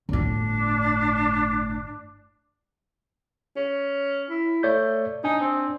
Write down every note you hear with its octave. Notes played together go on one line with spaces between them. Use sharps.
G1 A2 D4
C#4
E4
A3 C#5 D5 G6
D4 D#4 G#5
C4